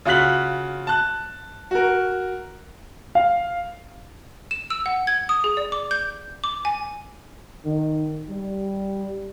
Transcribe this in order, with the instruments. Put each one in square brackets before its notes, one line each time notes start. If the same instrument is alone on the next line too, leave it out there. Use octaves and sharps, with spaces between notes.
[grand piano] C#3 F4 F#4 F#6 B6 F#7
A5 F#6
F#4 A#4
F5
[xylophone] E7
E6
F#5
G#6
D#6
G#4
D5
D6
G6
D6
G#5
[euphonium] D#3
G3